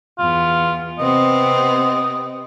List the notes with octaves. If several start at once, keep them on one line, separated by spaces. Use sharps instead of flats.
E2 F4
C3 B3 C4 D#5